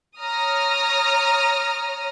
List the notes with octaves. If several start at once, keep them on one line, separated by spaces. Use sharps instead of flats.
C#5 A#5 D#6 F6